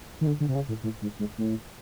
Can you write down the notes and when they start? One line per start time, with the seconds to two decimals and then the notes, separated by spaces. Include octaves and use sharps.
0.21 D#3
0.27 D3
0.40 D3
0.49 C3
0.55 C#3
0.68 A2
0.83 A2
1.02 G#2
1.19 G#2
1.38 A2